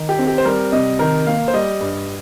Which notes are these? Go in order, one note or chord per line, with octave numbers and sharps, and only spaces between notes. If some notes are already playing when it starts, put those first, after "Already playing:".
Already playing: D#3
G4
C4
G4
C5
G3 A#4
C3 D#5
D#3 A#4
A#3 F5
C5
G3 D#5
G2